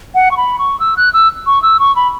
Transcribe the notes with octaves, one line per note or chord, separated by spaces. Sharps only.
F#5
C#6
B5
C#6
E6
F#6
E6
C#6
E6
C#6
B5